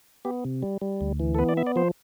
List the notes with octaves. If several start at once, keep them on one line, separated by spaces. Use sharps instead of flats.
B3 G4
C3
G3
G3
D2
E3
A4
B3 B4
D5
B3 E5
D5
F3 C5